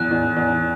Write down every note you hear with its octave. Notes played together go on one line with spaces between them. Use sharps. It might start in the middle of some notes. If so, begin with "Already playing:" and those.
Already playing: E2 F#6
E2
E2